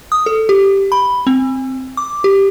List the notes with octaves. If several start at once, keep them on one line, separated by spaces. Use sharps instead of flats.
D#6
A4
G4
B5
C4
D6
G4